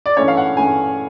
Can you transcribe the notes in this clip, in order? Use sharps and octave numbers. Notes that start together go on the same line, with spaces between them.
D5
G2 E3 A3 C#4 C#5
F5
F#5
G2 E3 A3 C#4 G#5